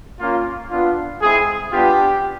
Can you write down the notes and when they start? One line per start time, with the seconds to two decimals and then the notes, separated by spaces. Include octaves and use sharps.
0.20 A#3 C#4 F4
0.71 B3 D4 F4
1.21 G#3 C4 E4 G#4
1.72 G3 B3 D4 F4 G4